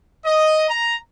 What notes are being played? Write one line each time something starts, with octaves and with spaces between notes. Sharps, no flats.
D#5
A#5